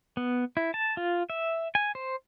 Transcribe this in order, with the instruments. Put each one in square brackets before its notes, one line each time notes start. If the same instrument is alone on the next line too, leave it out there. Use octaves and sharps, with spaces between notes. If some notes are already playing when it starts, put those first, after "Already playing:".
[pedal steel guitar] B3
E4
A5
F4
E5
G#5
C5